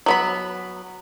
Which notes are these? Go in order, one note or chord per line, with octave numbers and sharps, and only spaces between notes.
F#3 B3 B5